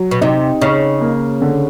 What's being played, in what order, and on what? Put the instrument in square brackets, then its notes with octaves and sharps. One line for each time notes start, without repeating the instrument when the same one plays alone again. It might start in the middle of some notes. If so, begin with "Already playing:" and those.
Already playing: [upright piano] F#3
[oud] B2
[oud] C3 [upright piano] D#4
[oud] C#3 [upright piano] D#4
[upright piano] A#3
D3